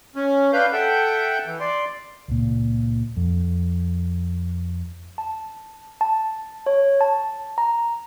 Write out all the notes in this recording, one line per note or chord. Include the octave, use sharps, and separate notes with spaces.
C#4
D4 B4 F5 G6
A4 E5 F#5 G5 G6
E3
D5 C6
C#2 A#2
F2
A5
A5
C#5
A5
A#5